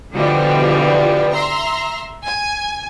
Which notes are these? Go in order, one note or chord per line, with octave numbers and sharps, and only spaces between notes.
B2 D3 E3 F3 G3 B3
E5 A#5 C6
G#5